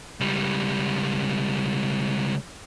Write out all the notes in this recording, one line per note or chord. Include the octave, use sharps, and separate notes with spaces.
C#2 G3